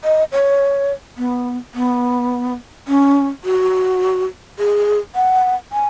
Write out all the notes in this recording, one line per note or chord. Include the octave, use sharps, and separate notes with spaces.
D#5
C#5
B3
B3
C#4
F#4
G#4
F#5
G#5